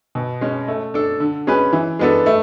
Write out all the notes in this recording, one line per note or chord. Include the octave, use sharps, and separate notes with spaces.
B2
G#3 C#4
A3
D4 A4
D3
G#3 C#4 G#4 B4
E3
G#3 B3 D4 A4
A3